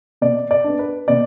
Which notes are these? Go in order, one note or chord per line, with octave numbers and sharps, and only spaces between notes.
B2 D5
D5
B3 D4
B4
B2 D5